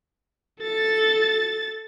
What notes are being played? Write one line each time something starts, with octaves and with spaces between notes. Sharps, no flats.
A4 A6